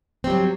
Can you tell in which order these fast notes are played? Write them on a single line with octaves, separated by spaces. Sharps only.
C4 G3 F#3